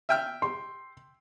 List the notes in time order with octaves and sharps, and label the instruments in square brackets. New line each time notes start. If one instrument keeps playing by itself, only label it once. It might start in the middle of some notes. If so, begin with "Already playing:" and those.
[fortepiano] E5 G5 F6
[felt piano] C6